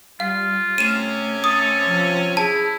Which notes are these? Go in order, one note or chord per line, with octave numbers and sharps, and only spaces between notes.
G3 F4 F5
C3 A3 C#4 D#7 E7
A4 D#6
F3
E4 G#4 A5